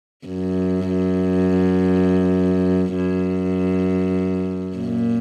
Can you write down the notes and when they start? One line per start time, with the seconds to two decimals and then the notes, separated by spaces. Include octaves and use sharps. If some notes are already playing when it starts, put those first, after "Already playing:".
0.26 F#2
2.96 F#2
4.77 A#2